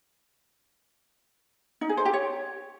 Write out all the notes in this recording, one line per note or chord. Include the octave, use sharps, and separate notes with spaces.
D#4
G#4
C5
G4
C#5